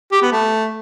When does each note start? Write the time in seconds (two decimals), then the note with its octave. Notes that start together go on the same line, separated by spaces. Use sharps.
0.12 G4
0.22 B3
0.32 A3